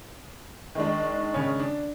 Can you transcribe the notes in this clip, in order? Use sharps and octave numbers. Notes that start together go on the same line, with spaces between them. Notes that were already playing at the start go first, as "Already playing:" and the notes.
D#3 G#3 D4
C#3 C#4
D4